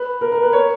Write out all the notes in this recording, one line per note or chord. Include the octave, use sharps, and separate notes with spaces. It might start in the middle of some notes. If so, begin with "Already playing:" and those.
Already playing: B4
A#4
A#4
B4
C#5